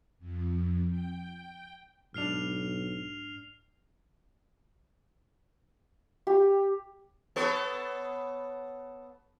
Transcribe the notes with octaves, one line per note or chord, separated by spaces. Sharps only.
F2
G5
B1 G#2 D4 F6 C7 F7
G4
B3 A4 C#5